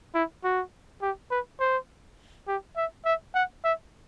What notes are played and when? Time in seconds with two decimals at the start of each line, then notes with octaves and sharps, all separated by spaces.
0.15 E4
0.44 F#4
1.02 G4
1.31 B4
1.60 C5
2.48 G4
2.77 E5
3.05 E5
3.35 F#5
3.64 E5